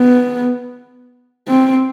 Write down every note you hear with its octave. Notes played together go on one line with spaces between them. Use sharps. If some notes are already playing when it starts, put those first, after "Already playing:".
Already playing: B3
C4